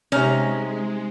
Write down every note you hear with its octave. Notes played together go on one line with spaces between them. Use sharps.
C3 G#3 C#4 D#4 A#5 F6